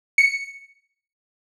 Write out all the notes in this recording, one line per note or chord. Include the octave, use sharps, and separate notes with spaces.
C#7